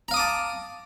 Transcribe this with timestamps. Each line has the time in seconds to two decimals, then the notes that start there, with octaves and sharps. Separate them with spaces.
0.08 A#5
0.11 F5
0.14 D#6
0.17 D6
0.19 A5